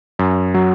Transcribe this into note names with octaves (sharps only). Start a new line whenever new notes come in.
F#2
F#3